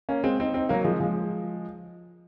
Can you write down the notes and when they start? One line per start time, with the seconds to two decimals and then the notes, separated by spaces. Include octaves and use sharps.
0.09 A#3 C#4
0.24 G#3 C4
0.39 C4 D#4
0.54 C4 D#4
0.69 F#3 A#3
0.85 F3 G#3
1.00 F3 G#3